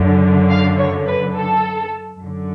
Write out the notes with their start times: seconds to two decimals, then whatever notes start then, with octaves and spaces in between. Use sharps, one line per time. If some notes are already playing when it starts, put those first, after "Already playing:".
Already playing: F#2 D3
0.50 F5
0.78 C#5
1.07 B4
1.35 A4
2.19 F#2 D3